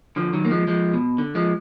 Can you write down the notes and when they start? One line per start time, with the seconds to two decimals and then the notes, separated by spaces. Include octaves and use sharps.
0.16 D3 F3
0.33 D#3 F#3
0.45 A#3
0.50 F3 G#3
0.67 F3 G#3
0.93 B2
1.18 D3
1.35 F3 G#3